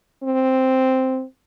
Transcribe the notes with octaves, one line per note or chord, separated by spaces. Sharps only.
C4